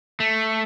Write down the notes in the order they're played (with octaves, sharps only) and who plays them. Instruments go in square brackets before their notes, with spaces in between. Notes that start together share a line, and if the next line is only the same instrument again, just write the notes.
[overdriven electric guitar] A3